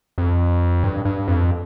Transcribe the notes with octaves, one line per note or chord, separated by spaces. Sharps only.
F2
G2
G2
F2